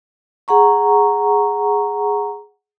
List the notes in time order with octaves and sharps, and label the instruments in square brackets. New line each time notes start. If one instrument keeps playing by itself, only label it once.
[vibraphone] G#4 F#5 A#5 C#6